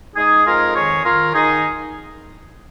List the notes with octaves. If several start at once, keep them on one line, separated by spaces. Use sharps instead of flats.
G#3 D#4 G#4
F2 F4 A#4
D#3 G#4 C#5
D#3 F4 A#4
D#3 D#4 G#4